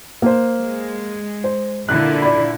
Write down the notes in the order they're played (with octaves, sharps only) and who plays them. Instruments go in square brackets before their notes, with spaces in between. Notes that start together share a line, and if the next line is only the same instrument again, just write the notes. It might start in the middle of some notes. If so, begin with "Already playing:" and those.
[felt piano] A#3 C5
[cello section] G#3
[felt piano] C5
[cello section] A#2 D3 E4 [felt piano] F#6
[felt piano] D5 B5